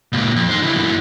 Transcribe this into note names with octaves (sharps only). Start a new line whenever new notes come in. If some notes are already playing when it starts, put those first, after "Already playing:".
C#2 A#2
F2
D#4 C5
C#3 E3
F#2 E3